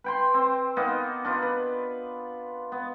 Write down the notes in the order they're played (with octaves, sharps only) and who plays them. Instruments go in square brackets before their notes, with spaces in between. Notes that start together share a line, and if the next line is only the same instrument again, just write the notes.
[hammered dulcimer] B4 G5 C6
C4
A#3 B3 D#4
D4 F4 B4 D#5
B4
B3